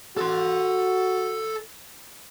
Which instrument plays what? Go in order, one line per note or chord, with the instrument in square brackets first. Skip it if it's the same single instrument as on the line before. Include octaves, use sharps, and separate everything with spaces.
[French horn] F#4 [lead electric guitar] A4 C6